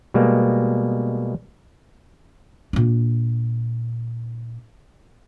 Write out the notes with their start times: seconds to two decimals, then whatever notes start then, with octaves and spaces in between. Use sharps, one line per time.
0.14 B2 G3 G#3 A#3
2.73 A#2 D4